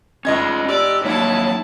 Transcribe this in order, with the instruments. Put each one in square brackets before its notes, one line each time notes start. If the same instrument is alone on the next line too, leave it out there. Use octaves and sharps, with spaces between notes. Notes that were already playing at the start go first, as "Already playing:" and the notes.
[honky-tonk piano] F1 D#5 G#6 [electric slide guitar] C#4 F4
[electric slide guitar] G4 [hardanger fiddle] D5 [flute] E6
[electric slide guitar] F#3 A#3 D#4 [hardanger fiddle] E4 A5 [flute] C#5